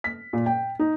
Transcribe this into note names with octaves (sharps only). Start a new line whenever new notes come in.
B6
A#2
G5
D#4